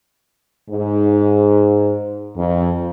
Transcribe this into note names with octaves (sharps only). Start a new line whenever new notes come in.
G#2
F2